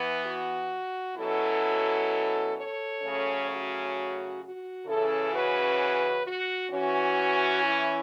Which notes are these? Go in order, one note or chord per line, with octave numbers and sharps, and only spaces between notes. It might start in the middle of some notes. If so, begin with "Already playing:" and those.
Already playing: E3 B3
F#4
B2 F#3 C#4 E4 A4
A4 C#5
C#3 F#3 A3 C#4
F#4
F#4
C#3 E3 C#4 E4 A4
F#4 B4
F#4
E3 C#4 F#4
E4